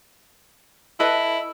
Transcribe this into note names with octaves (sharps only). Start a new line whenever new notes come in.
E4 A4 B4 D#5